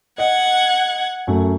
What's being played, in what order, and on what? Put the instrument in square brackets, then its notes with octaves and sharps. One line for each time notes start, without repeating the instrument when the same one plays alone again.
[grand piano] D#5 [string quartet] F#5 G#6
[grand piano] F#2 A3